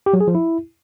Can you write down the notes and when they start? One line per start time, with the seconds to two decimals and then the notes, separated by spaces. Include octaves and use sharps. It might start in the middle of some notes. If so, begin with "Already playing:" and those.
0.06 G4
0.13 F#3
0.21 G#4
0.28 F3
0.35 E4